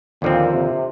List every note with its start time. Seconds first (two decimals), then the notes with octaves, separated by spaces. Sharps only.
0.22 D#2 A#2 D3 F3 C4
0.52 C3